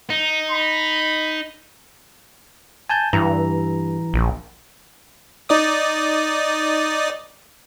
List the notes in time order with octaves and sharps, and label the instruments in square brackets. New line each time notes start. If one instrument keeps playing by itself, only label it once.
[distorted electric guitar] D#4
[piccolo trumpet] B5
[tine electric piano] G#5 A5 G6
[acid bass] G2 [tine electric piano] E3 A#5
[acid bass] A#1
[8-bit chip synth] D#4 D5 D#6